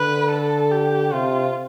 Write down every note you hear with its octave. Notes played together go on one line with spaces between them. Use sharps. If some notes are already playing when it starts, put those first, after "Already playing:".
Already playing: D3 B4
A4
G4
C3 F4